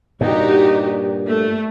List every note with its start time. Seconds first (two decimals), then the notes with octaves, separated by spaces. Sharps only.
0.21 G2 A#2 D#4 F#4 G4
1.27 A3